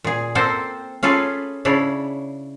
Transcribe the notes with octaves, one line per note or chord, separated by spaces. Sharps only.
A#2 G#4
A#3 C4 A4 C5
C#4 F4 G#4 A4 B4
C#3 D4 E4 C#5